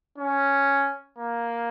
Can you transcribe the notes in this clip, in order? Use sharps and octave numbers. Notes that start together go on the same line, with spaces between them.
C#4
A#3